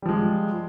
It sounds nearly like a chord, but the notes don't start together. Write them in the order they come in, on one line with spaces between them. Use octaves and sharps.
G3 F3 G#3